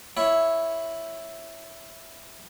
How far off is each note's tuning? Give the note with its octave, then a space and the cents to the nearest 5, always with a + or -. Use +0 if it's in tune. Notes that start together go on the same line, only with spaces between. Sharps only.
E4 +0 C#5 +0 E5 +0